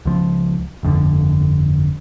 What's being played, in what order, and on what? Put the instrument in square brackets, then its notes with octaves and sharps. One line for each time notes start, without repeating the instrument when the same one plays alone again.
[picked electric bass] C#2 F3
G1 F2 B2 D3